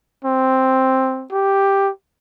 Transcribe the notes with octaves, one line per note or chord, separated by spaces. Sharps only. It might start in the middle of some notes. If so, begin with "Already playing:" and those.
C4
G4